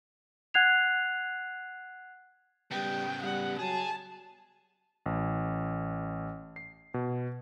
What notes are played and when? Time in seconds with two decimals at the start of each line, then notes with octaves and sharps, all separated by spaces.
0.54 F#5 F#6 G#6 C7 F7
2.71 C#3 G3 B3 G5
3.23 G3 F#5
3.59 F#3 G#4 A5
5.06 A1
6.56 C7
6.94 B2